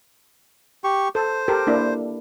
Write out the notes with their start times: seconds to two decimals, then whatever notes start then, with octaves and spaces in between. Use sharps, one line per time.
0.84 G4 C#6
1.15 A4 C5
1.48 G4 A4 A#4
1.67 A#3 D4 E4